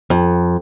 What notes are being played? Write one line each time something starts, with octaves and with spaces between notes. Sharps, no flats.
F2